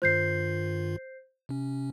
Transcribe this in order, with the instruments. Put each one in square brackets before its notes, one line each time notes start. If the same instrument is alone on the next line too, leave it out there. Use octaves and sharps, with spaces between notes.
[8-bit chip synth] G2 D#3 F4 [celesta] C5 G6 C7
[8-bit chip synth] C3 C#4